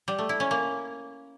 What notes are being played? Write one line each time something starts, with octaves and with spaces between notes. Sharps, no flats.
G3
A3
E4
C#4
A#3